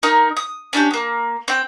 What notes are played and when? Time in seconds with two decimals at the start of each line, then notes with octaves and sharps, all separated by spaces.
0.03 D#4 A#4
0.37 D#6
0.73 C#4 D4 E4 G4
0.91 A#3 B3
1.48 C4 G5